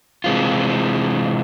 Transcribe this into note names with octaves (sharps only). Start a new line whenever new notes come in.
C3 E3 G#3 C4 F4